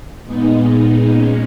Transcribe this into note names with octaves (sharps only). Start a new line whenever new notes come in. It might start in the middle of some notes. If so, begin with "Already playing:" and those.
A#2 G#3 B3 D#4
A#2 G#3 C#4